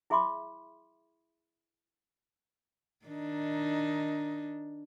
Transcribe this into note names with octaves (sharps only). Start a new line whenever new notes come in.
E4 G#4 E5 B5 C6 D6
D#3 D4 D#4